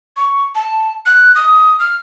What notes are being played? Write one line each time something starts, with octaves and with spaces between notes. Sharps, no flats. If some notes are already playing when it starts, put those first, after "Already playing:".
C#6
A5
F#6
D#6
F6